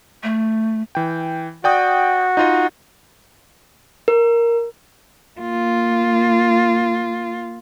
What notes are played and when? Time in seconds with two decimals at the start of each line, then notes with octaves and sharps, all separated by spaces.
0.23 A3
0.95 E3 G5
1.64 F#4 D5 G5 D#6
2.37 D#4 F4 D#5
4.08 A#4
5.40 A#3 F4